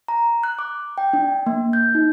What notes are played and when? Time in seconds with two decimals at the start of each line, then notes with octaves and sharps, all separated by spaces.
0.08 A#5
0.43 F#6
0.59 D6
0.98 G5
1.13 D4
1.46 A#3
1.73 G6
1.95 D#4